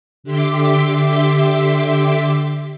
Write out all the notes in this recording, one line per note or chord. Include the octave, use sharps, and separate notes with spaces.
D3 G4 E5 C6 D6 B6